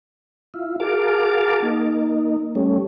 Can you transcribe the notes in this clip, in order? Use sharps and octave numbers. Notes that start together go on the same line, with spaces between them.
E4 F4
F#4 G#4 A#4 F5 A5 D6
A#3 D#4
G3 A3 C#4